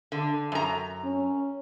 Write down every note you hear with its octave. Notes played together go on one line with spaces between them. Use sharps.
D3
F#2 A#5
C#4